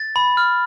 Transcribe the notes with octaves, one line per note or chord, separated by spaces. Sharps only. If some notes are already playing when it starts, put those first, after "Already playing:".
Already playing: A6
B5
F6